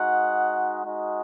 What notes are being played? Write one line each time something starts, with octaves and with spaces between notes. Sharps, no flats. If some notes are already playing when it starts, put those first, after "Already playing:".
Already playing: G#3 D#4 F#4 F#5
G#3 D#4 F#4